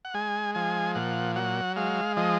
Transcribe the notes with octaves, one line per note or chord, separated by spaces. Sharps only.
F#5
G#3 G#5
F3 G#5
A#2 F#5
F#3 F#5
G#3 F5
F3 D#5